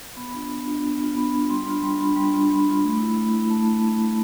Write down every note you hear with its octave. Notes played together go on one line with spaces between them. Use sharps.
B3 B5
D4 F4
B3
D4 F4
B3
D4 F4
B3 B5
D4 F4
G3 C6
D4 F4 B5
G3 C6
D4 F4 B5
G3 C6
D4 F4
G3 B5
D4 F4
A3
E4
A3
E4
A3 A5